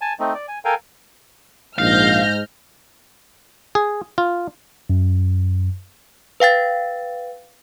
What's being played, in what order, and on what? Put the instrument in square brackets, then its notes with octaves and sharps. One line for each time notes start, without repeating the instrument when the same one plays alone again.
[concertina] G#5 A5
A3 C4 D#4
D5
G#5
A4 A#4 F5 G5 G#5
[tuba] A#1 [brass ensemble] G#2 [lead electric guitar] F5 [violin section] F6 G6 A#6
[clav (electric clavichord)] G#4
F4
[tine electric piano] F#2
[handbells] B4 F5 G5 A6